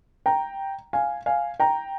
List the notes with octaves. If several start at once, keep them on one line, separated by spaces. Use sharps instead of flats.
G5 A#5
F5 G#5
F5 G#5
G5 A#5